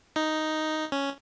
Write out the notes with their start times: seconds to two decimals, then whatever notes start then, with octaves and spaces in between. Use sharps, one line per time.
0.16 D#4
0.92 C#4